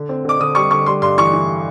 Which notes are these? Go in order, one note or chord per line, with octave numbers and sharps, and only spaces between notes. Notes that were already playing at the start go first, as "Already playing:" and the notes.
Already playing: D3
C4
D3 D6
D3 D#6
G3 C#6
D3 C#6
G3 C6
G2 C6
E3 C#6
E3